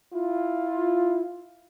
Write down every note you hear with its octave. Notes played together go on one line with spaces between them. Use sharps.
E4 F4